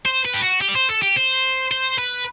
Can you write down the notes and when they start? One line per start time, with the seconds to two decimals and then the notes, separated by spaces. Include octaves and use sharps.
0.05 C5
0.25 B4
0.34 G4
0.42 F#4
0.61 G4
0.68 D5
0.75 C5
0.89 A4
1.02 G4
1.16 C5
1.71 C5
1.98 B4